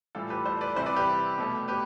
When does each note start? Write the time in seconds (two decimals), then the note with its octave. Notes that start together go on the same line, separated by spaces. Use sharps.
0.15 A2 E3 G3 F4 A4
0.30 G4 B4
0.46 A4 C5
0.61 B4 D5
0.76 C3 E3 G3 C5 E5
0.86 B4 D5
0.96 G4 B4
1.38 B2 A3
1.68 G4 B4